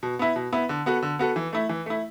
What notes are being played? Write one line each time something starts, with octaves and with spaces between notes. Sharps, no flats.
B2
B3 E4
B2
B3 E4
D3
B3 F#4 A4
D3
B3 F#4 A4
E3
A3 E4
E3
A3 E4